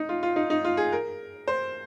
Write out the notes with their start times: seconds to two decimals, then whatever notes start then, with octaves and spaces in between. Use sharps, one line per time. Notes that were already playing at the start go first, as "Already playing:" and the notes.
Already playing: D#4
0.09 F4
0.23 F4
0.36 D#4
0.50 D#4
0.65 F4
0.77 G#4
0.92 A#4
1.48 C5